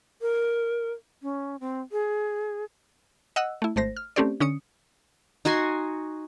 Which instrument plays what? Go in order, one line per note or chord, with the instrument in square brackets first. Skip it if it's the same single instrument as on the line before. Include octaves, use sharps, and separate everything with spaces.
[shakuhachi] A#4
C#4
C4
G#4
[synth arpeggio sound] D#5 F#5 E6 F#6
A3 E4
G#1 A3 C5 A#6
F6
A3 C4 C#4 G4 C5 D5
D3 C#4 D#6 C#7
[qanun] D#4 F#4 G#5 C6